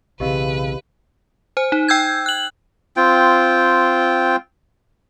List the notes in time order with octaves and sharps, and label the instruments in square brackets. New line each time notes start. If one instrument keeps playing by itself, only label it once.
[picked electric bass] B1 E3 C4 [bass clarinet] C#3 [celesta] G4 D#5 F5 [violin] B4
[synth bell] C5 G#5
D#4
G5 E6 G6 G#6
F#6 F#7
[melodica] C4 F4 G5